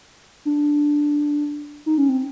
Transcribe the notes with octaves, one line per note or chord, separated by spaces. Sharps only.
D4
D#4
C#4
C4